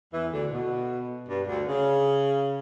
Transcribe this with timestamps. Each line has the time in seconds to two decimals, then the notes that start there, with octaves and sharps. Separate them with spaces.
0.13 E2 E3
0.32 D2 D3
0.51 B2
1.29 G2
1.48 D2 D3
1.67 C#3